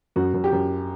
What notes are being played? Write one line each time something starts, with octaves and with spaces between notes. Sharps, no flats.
F#2 F#4
F#2
G4
F#2